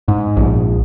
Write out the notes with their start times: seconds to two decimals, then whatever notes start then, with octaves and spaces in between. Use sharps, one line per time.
0.08 G#2
0.37 A#1